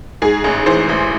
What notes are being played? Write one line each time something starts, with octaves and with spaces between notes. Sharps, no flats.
G#2 G#4
A1
E3 C5
A1